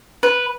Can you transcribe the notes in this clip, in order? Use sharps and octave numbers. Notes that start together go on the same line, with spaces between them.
B4